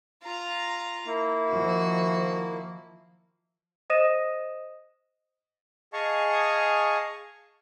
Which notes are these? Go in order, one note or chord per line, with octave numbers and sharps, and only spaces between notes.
F4 A#5
A#3 E4
D#3 F3 F#4
C5 D#5 D#6 A#6 D#7 E7
G#4 D#5 F5 G#5 A5 C#6